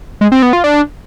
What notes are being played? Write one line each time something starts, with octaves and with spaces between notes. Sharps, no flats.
G#3
C4
B3
F4
D4